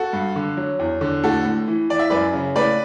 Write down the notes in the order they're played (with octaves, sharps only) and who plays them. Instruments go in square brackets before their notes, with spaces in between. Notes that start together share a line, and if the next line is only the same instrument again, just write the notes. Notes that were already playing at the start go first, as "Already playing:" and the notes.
Already playing: [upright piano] F#4 A4
G2
D3
F#3
E2
D3
A2 F#4 A4
A2
E3
E3 D5
E5
F#2 B4 D5
C#3
A2 B4 D5